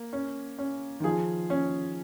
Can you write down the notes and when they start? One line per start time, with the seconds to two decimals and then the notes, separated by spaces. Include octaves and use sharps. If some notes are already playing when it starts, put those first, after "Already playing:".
Already playing: A#3
0.13 C#4
0.59 C#4
1.00 D#3
1.04 F3 G#4
1.50 C#4